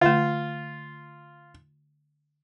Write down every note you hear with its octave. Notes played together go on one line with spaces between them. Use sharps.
D3 A3 F4